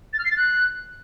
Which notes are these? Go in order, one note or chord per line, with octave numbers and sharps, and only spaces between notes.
A6
F6
C7
A6
F#6